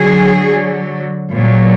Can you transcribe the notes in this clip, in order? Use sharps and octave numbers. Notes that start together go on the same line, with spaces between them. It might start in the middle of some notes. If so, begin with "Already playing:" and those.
Already playing: D3 F#3 G#4
A#2 F#3